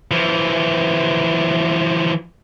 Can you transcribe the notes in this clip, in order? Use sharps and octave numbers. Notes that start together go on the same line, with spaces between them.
E3 F3